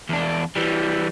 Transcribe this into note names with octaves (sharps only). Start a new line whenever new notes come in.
E2 D4
E3 G3